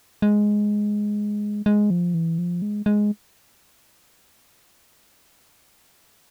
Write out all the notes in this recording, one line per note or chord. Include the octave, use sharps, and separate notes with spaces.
G#3
G#3
F3
E3
F3
G#3
G#3